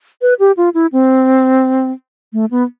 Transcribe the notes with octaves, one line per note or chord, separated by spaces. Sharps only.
B4
G4
F4
E4
C4
A3
B3